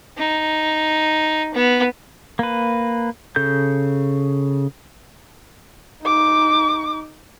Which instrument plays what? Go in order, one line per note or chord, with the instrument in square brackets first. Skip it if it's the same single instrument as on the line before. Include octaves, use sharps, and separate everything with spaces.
[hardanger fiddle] D#4
B3
[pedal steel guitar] A#3 B4
C#3 A4 G6
[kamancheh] D#4 D6